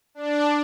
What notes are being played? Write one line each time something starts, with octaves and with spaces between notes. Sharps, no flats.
D4